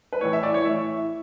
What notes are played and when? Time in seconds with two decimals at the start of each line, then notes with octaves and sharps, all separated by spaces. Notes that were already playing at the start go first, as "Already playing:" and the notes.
0.13 B4
0.21 A2 E3 C#5
0.33 E5
0.43 D5
0.54 C#5
0.64 A2 E3 E5